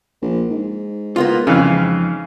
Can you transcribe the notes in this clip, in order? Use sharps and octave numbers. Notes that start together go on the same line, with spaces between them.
A#1
G#2
A#3 B3 F4
F2 C#3 E3 F5